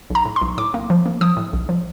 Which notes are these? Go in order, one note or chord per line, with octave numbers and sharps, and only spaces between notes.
B1 A#5
A2
C6
B1
A2 D6
A#3
F3
A#3
F3 D#6
A2
B1
F3